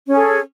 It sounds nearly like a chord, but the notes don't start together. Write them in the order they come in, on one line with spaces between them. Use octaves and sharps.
C#4 G#4 A4